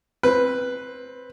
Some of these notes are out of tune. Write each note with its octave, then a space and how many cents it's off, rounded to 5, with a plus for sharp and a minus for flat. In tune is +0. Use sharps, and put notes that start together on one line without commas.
C4 +10 B4 +0